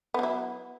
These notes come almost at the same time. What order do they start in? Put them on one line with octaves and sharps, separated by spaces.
B3 F#3 E4